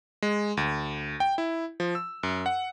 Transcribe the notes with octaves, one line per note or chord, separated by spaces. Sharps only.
G#3
D2
G5
E4
F3
E6
F#2
F#5